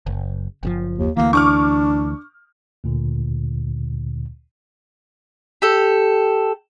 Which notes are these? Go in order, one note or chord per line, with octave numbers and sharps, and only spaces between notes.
F#1
F#1 B2 F3
D#2
D2 E3 A#3
D4 C#6 D6 F6
D2 A#2 D3
G4 A4